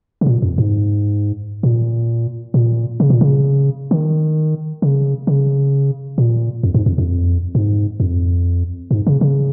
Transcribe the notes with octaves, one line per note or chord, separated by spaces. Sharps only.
C#3
A#2
F2
G#2
A#2
A#2
C#3
A#2
C#3
D#3
C#3
C#3
A#2
F2
G#2
F2
F2
G#2
F2
G#2
C#3
C#3